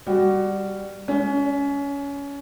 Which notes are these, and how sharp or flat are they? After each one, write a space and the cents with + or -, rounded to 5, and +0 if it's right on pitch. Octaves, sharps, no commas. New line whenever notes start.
G3 +10 F#4 +20
G#3 +0 C#4 +25